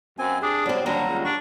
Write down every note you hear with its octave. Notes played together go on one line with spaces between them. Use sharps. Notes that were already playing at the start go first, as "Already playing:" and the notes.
F#2 C4 G#5
D4 G4 G#4
F#3 G3 C4
D#2 D3 F#3 G3 A#5
C#2
D4 C#6